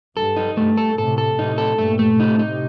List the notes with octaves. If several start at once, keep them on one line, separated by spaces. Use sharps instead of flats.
G2 A4
D#4
G2 A3
A4
A2 C3 A4
A4
A2 C3 D#4
A4
G2 A#2 A3
A3
A2 C3 D#4
D#4